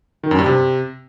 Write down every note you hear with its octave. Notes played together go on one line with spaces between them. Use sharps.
D#3
F#2
G2
C3